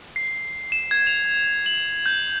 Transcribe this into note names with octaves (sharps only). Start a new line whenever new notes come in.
C7
E7
G#6
F7
F#7
G6